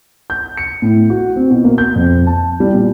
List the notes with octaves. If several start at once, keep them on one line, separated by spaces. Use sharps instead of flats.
G6
C#7
A2
F#4
C4
B2
A#3
G6
F2
A5
G3
A#2